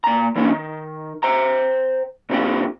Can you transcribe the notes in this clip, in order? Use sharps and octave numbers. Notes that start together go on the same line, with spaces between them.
A#2 A#5
E3 A#3 C#4 D4
D#3
C5 G5 A#5
A#2 D3 C4 D#4 F4 G4